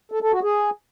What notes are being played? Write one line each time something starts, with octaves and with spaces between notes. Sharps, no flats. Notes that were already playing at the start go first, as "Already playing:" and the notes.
A4
A4
F#4
G#4